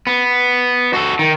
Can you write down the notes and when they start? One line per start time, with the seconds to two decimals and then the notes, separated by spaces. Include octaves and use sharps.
0.07 B3
0.94 F#4 A4
1.19 D#3